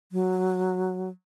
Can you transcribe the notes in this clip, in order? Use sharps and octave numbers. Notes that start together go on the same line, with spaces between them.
F#3